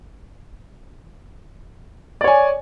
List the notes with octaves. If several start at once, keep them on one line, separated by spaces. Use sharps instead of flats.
C#5 D5 G#5